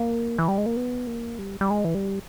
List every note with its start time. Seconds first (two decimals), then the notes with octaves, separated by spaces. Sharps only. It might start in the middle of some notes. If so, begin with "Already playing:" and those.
Already playing: A#3
0.38 E3
0.48 G3
0.58 G#3
0.66 A#3
0.77 B3
1.07 A#3
1.39 G3
1.61 G3
1.71 G#3
1.85 E3
1.95 G3